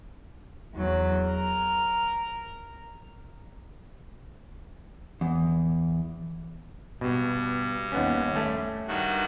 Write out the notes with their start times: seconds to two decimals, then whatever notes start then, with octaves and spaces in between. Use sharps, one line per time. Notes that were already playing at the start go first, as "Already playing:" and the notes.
0.74 E2 F#3
1.24 A#4
5.21 E2
7.01 G2 B2
7.92 D#2 B3 C#4
8.35 A3 C#4
8.88 G2 D#3 F#4